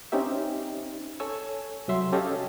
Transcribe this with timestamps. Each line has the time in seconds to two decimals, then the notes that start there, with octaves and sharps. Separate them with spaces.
0.12 C4 C#4 D#4 G4 E5
1.20 A4 C#5 G#5 E6
1.88 C2 F#3 E5 C6
2.12 C#4 G4 A4 C#5 D#5 F5